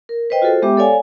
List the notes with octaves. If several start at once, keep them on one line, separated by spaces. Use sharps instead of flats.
A#4
B4 C5 D#5 G5
F4 F#4 G#4 A4 C5
G#3 B3 G4 E5 G5 D6
A4 C#5 D5 F5 G#5